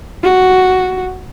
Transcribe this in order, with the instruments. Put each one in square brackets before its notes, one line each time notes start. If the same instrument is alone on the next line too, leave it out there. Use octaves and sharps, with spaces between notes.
[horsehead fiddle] F#4